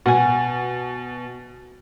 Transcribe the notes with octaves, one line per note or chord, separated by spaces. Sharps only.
B2 F#5 G#5